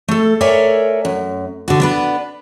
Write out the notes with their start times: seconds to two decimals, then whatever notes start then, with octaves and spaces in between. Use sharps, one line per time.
0.08 A3 A4
0.41 A4 A#4 C#5 D5 E5 G#5
1.05 F#2
1.68 D3 F#4
1.80 B3 D4 B4